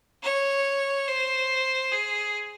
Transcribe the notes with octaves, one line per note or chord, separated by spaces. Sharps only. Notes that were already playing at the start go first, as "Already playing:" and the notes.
C#5
C5
G#4